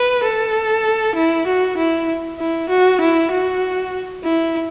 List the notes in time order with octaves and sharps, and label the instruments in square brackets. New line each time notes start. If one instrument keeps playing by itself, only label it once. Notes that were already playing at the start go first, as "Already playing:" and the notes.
Already playing: [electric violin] B4
A4
E4
F#4
E4
E4
F#4
E4
F#4
E4